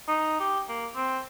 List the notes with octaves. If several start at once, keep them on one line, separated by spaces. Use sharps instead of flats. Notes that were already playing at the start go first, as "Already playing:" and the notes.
D#4
G4
A#3
C4